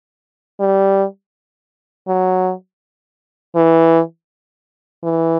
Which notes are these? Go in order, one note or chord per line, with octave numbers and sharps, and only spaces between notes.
G3
F#3
E3
E3